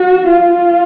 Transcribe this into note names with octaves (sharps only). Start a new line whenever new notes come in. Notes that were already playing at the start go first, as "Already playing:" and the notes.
Already playing: F#4
F4